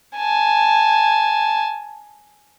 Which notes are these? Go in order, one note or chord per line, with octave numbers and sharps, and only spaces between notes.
G#5 A5